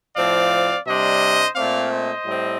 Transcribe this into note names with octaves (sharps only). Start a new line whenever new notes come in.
A2 F3 C4 D5 F5
C3 G3 D4 C5 D#5
A#2 A3 C4 D5 F5
C5 D#5
A2 G3 C4